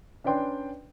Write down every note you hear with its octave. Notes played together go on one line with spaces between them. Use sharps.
C#4 D4 B4 D5 G5 C6